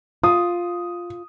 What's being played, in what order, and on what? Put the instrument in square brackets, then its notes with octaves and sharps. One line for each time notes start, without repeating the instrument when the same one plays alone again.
[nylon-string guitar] F4 [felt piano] D#6